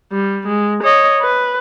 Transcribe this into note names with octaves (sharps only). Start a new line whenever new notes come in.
G3
G#3
C#5 D#5
B4